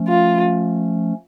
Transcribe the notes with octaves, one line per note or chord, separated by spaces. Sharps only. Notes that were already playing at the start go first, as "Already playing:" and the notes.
Already playing: F3 A3 C#4
F4